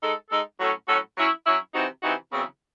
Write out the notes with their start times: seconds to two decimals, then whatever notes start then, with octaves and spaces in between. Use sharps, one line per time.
0.02 G#3 D#4 A4
0.30 G#3 D#4 A4
0.60 A2 F#3 C#4 F#4 A4
0.88 A2 F#3 C#4 F#4 A4
1.17 F#3 C#4 E4
1.46 F#3 C#4 E4
1.74 C3 E3 C4 D#4 F#4
2.03 C3 E3 C4 D#4 F#4
2.31 E2 C#3 F#3 C4 E4